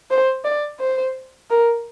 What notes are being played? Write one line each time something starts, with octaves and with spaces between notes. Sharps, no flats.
C5
D5
C5
A#4